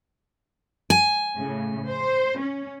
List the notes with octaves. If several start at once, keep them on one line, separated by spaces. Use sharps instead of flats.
G#5
A2 C#3
C5
C#4